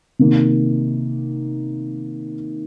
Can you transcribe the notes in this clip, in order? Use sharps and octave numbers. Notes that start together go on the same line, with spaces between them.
C3 D#3 A#3